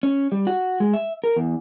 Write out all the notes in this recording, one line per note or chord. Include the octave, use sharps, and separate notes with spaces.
C#4
G3
F#4
G#3
E5
A#4
E2